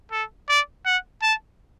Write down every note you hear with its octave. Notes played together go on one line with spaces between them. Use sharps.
A4
D5
F#5
A5